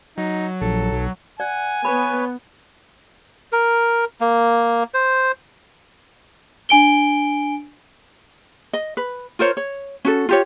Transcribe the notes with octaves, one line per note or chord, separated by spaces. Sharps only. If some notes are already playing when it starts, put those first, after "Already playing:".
F#3 D#4
A#1 A4
B1
D5 F#5 G#5
B3 B4 C#5 B5
A#4
A#3
C5
D4 G#5 D7 G7
D#5
B4
F4 A#4 C5 C#5
C#5
C#4 F#4 A4
F4 G4 C#5